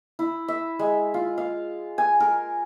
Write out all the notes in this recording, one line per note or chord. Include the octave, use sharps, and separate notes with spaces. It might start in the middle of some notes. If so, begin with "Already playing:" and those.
E4
E5
G#3
F4
F5
G#5
A#4